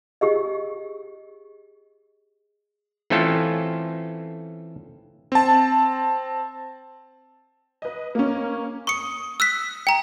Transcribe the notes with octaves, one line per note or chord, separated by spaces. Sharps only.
G4 G#4 D#5
E3 A3 C4 C#4 F4 A4
C4 A5
B4 D#5
A#3 C#4
C#6 D#6 C#7
E6 F#6 B6
G5 A#5